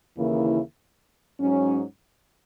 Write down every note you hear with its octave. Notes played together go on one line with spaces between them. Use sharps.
D#2 C#3 E3 A#3 E4
G#2 F#3 C#4